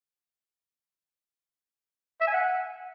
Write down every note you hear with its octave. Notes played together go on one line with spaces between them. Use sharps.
E5
G#5
F#5